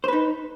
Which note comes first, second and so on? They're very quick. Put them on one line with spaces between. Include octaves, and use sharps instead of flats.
C5 B4 D#4